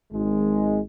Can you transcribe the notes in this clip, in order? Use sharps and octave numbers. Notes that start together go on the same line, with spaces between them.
G#1 G#3